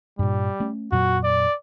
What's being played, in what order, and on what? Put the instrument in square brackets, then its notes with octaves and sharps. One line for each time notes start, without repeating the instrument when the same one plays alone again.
[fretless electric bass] G2 A#2 [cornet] G3
[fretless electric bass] A3 C#4
[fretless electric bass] F2 A#2 F#3 [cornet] F#4
[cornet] D5